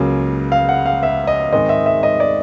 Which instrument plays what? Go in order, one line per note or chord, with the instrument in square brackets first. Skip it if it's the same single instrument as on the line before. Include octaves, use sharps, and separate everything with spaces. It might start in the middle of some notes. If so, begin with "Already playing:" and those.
Already playing: [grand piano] C#2 C#3 F#3 A#3
F5
F#5
F5
E5
D#5
G#2 D#3 G#3 C4 D#5
E5
E5
D#5
D5